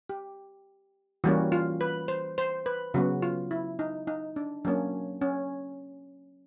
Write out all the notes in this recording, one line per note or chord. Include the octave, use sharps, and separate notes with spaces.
G4
E3 G3 A#3 C#4 F#4
F4
B4
C5
C5
B4
C#3 F#3 B3 F#4
F4
E4
D#4
D#4
D4
F#3 A#3 C#4 D4
C#4